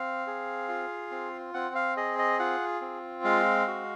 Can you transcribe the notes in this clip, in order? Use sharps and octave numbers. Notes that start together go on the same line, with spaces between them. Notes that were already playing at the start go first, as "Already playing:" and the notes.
Already playing: C4 F5
G#4
F4
C4
C4 F#5
F5
G#4 D#5
D#5
F4 F#5
C4
G#3 F5
F#4